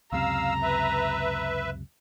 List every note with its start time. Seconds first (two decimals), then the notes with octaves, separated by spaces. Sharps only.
0.12 C#2 F#2 C3 F5 A#5 E6
0.62 B4 E5